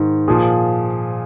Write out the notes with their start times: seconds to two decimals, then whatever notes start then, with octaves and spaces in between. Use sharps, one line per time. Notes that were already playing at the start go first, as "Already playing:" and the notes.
Already playing: G#2 D#3
0.28 A#2 F3 G#4